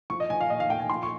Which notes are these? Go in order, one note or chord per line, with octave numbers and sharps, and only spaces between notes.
F3 C#6
D#5
F3 G#5
F5
A#2 D#5
F5
A#2 G5
G#5
F3 C6
C#6